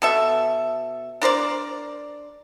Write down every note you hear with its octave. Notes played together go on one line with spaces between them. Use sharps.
B2 A4 E5
D4 A#4 C5 D5